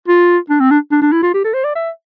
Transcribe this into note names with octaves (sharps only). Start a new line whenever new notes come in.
F4
D4
C4
D4
D4
D4
E4
F4
G4
A4
C5
D5
E5